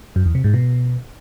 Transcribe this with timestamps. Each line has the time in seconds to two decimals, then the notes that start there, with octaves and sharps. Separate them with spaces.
0.16 F#2
0.25 E2
0.35 C3
0.44 G#2
0.54 B2